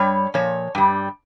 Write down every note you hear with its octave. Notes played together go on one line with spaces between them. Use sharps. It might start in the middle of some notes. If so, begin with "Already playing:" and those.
Already playing: G2 G3 C#5
A#2 F3 C#5
G2 G3